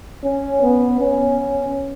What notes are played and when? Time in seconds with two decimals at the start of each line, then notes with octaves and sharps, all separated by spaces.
0.24 C#4
0.62 B3
1.00 C#4